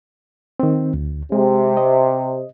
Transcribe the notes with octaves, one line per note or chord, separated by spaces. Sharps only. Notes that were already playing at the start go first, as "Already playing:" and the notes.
D#3 C4
D2
C3 G#3
D#5